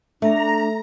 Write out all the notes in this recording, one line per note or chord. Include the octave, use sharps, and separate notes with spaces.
A3 D4 E5 A#5